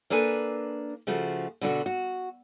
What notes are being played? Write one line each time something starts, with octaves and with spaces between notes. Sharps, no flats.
A#3 D4 A4 B4 G#5
C#3 F3 A3 F#4
B2 D3 F#4
F#4